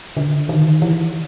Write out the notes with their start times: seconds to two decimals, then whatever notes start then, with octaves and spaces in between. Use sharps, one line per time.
0.17 D3
0.49 D#3
0.82 E3